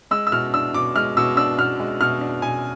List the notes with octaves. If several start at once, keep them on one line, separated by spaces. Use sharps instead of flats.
G#3 E6
E6
B2 F6
D4 E6
B2 D6
G#3 F6
B2 E6
D4 E6
B2 F6
G#3
B2 F6
D4
B2 G#5